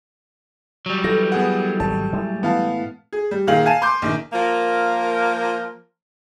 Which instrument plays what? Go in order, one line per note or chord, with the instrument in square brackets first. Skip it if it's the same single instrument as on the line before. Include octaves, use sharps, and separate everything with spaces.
[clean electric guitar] F#3 G3
[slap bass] E3 [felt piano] A4 [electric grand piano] A#6
[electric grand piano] B3 G#4 F#5
[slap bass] G#1 B2 [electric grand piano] A5
[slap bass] A2 G#3 A3
[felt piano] E3 [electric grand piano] B3 F5 A5
[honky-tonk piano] G#4
G3
A#2 D#3 G#4 F5 F#7
F5 G#5 A5 D#7
C6 D6 G6
A#1 D#3
[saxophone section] F3 A#3 A#4